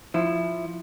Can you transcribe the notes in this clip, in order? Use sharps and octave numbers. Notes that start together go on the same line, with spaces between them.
F3 E4